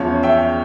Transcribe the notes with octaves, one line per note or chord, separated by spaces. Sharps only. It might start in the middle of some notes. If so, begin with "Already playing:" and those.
Already playing: E2 C#3 F3 C#5 F5
E5 G5